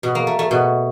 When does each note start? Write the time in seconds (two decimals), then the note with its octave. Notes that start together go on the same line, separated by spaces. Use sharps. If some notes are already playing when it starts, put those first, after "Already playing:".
0.03 B2
0.15 A#3
0.27 A3
0.39 A3
0.51 B2